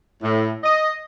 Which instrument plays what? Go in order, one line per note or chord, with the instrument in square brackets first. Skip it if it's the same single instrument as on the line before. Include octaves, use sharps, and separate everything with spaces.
[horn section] A2
D#5